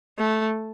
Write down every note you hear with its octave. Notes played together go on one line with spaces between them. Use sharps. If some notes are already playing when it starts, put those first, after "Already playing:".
A3